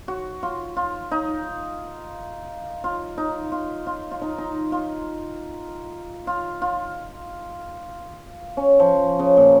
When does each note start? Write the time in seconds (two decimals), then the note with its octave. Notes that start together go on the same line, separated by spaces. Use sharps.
0.08 F#4
0.43 F4
0.77 F4
1.11 D#4
2.84 F4
3.18 D#4
3.52 F4
3.87 F4
4.12 F4
4.22 D#4
4.38 D#4
4.72 F4
6.27 F4
6.62 F4
8.57 C#4
8.80 F3
9.19 C#3
9.37 A#2